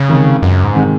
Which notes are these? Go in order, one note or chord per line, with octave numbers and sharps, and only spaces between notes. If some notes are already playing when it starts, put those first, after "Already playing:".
Already playing: C#3
C3 D#3 G#3
C#2 F#2
G#2
C3 D#3 G#3